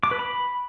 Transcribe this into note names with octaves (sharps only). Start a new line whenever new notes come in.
D6
B4
B5